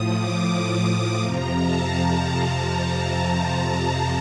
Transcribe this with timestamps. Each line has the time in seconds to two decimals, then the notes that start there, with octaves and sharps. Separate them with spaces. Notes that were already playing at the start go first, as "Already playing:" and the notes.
Already playing: A2 F3 D#6
0.13 D6
1.21 F2 C3 F3 A#5
1.58 A5